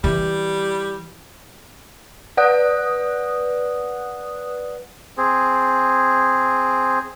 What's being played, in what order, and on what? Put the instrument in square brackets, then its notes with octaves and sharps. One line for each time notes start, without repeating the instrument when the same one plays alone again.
[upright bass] E3 [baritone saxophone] G3
[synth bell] B4 D5 F#5 D#6 F#6
[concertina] C4 G#4